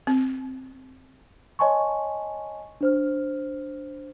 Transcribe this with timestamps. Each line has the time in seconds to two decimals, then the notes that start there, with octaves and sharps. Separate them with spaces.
0.07 C4
1.59 C#5 D#5 G#5 A5 C6 C#6
2.81 D4 C5 F6